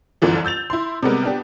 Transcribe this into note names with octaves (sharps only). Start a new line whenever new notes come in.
G1 C2 F#2 D3 E3 F3
E6 G6 A6 F7
E4 C6
C3 G3 G#3 B3 A#4
B3 D4 G4